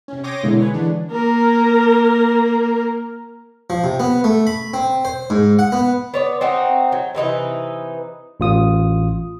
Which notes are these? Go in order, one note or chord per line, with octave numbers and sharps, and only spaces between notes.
C3 C#4
C#5 G5 C6 D6 D#6 A#6
B2 D3 G#3 A#3 E4
G#4 B4 C#5
D3 E3 G#3 D4
A#3 A#4
F3
C3
B3
A3
B5
C4
C5
G#2
F#5
B3
B3 C#5 D5
C4 D#4 F#4
F#3
C3 E3 D#4 B4
A1 F4 D#6